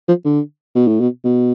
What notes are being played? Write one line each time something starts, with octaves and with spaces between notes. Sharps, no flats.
F3
D3
B2
A2
B2
B2